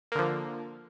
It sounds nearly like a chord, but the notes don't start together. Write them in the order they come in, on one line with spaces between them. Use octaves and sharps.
A#3 D3 F3